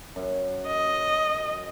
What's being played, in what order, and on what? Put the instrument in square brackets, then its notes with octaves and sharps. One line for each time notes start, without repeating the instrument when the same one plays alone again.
[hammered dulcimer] F#2
[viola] D#5